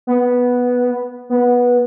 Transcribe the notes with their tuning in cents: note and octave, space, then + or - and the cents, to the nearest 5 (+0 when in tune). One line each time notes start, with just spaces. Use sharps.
B3 -5
B3 -15